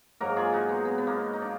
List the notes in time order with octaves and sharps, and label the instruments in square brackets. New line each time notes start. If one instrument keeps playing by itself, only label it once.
[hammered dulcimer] G#2 F#3 A#3 F#4 A#4
F4 G#4
D#4 F#4
B3
B3
B3
A#3
D#4
D4